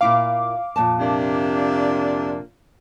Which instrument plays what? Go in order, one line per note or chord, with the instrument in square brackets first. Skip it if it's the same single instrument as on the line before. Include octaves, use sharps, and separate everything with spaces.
[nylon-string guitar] A#2 E4 F4 [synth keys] F5 D6
[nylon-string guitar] F2 A#2 A5
[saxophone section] C3 A#3 D4